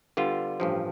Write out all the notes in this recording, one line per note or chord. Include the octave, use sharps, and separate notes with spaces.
D3 G3 B3 F4
A1 G2 F3